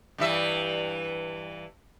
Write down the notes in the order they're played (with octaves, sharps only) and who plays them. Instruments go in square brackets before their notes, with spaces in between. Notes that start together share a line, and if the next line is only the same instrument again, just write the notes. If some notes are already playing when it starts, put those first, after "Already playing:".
[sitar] G2 E3 E5